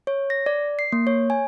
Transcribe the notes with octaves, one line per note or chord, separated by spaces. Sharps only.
C#5
A#6
D5
C7
A#3
C#5
G#5